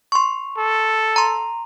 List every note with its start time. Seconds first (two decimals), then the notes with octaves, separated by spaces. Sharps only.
0.12 C6 C#6
0.57 A4
1.16 A#5 C6